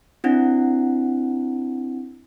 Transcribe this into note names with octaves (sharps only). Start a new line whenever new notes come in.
C4 D4 E4 F#5